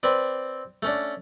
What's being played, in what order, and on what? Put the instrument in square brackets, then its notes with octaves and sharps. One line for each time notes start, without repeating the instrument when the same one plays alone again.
[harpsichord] C4 B4 D5
A3 C#4 D4